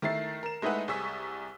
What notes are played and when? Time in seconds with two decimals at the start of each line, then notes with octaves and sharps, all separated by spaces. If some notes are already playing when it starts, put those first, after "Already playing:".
0.02 D#3 A3 E4 A6 C7
0.43 A#4 E7
0.62 G#3 A3 D#4 E4 B4 F#5
0.88 C2 G#4 C#6 E6 B6